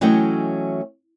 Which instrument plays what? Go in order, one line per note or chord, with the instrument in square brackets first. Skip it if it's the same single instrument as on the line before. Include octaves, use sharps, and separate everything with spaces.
[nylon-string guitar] E3 F#3 A3 C#4 D#5 G5